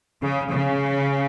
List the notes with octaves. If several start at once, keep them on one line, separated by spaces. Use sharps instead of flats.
C#3
C#3